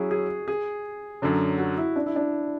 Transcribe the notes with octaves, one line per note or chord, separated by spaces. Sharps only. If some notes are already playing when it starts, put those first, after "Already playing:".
Already playing: F#3 C#4 E4 F#4 G#4
G#4
G#4
F#2 D3 F#3
F#4
E4
D4
E4
D4